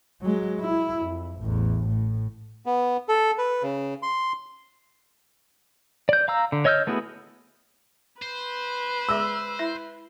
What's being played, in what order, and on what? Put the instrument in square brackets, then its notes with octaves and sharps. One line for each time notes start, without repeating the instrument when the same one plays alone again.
[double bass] F#3 G#3
E4
F2
A1 E2
A2
[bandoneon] B3
A4
B4
C#3
C6
[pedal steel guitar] D5 G6
F5 A#5 E6
D3
C#5 D#5 E6 F6 G6
A3 B3 E4 F#4 G#4
[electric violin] B4 [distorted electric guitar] C5
[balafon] G#3 G#4 E5 [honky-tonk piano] E6
[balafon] E4 E5